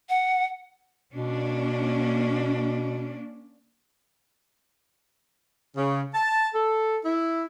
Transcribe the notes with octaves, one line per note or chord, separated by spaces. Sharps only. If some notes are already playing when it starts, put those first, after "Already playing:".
F#5
B2 A#3 C#4 D4
C#3
A5
A4
E4